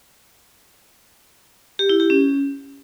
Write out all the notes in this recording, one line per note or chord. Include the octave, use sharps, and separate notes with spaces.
G4
E4
G4
C#4